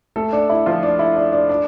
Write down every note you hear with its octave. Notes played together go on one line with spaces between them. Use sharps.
A3 A4
D4
E4
F3 F4
D4
E4
D4
D4
D4